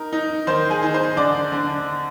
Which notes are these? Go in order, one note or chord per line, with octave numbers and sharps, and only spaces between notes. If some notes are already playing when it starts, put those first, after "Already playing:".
Already playing: D#4 A#4
D#4
D#3 C5 C6
G#4 G#5
D#4
C5 C6
D3 D5 D6
D3